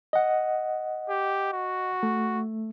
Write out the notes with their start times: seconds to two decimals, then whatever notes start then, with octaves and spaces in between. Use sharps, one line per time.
0.13 D#5 F#5
1.09 G4
1.53 F#4
2.03 A3